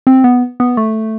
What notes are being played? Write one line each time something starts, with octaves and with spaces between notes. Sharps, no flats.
C4
B3
B3
A3